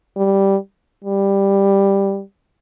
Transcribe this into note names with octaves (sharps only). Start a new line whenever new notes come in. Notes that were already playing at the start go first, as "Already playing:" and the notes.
G3
G3